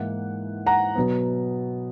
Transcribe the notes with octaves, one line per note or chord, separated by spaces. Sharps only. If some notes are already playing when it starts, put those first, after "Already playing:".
Already playing: G#2 E3 A#3 F#5
F#5 A#5
B2 F#3 B3